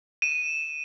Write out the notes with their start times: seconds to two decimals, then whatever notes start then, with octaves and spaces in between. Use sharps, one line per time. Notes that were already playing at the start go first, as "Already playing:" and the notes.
0.22 D#7 E7